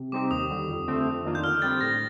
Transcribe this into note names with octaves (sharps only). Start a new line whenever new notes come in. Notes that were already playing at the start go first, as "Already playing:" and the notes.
Already playing: C3
G3 C4 D#4 G4 D6
D#2 D#6
D3 G3
F2
D3 A3 C4
F2
D#3 A#3 D4 F4
G6
D3 F6
G3 C4 G4 A6
A2 A#6